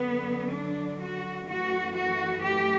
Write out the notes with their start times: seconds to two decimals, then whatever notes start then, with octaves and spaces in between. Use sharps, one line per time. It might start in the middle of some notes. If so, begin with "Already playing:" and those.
Already playing: F#2 D3 F#3 B3
0.52 D4
0.99 F#4
1.47 F#2 E3 A3 F#4
1.95 F#4
2.43 G4